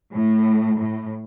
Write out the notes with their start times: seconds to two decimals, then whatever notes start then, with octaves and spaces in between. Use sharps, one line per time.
0.14 A2
0.79 A2